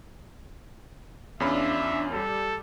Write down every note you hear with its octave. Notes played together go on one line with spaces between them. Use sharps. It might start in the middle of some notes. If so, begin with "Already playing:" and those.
E2 C#4 D4 F4 E5 B5
G3 A4